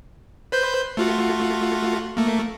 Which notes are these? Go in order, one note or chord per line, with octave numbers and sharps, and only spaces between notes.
B4 C5 G6
A3 F4 F#4
A3 A#3